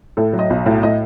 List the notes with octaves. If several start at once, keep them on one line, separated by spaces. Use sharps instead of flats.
A2 A4
F#3
D#5
B1
A2
A2 D#5